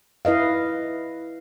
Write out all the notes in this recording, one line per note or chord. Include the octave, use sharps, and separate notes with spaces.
E4 B4 D#5 F5